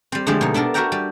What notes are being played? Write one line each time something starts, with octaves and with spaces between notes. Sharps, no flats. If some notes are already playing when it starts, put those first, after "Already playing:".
G3 C4
D3 F3 G#3 A3 E4 G4
B2 D#4
B3 D4 A4 A#4
F#4 A#4 E5 F#5 G5 A#5
G3